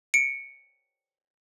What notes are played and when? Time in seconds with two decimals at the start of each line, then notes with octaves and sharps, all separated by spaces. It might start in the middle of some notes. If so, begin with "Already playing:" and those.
0.14 C#7 D7